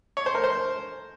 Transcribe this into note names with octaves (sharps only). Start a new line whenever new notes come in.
C#5
C5
A#4
C5